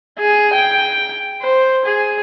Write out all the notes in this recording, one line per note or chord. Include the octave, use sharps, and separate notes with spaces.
G#4
G5
C5
G#4